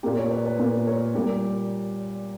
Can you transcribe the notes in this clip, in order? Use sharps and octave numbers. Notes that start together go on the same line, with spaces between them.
A#2 A#3 G4
A#4 C#5
B4 D5
B4 D5
A#2 A#3
A#4 C#5
A#2 G3 A#3 G4